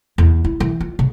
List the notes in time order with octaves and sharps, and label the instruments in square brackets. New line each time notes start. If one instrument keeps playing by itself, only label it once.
[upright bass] E2
E4
E3
F4
C#3